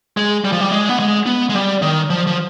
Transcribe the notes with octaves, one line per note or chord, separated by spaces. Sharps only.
G#3
G3
F3
G3
G#3
B3
G#3
B3
G#3
G3
D#3
F3
F3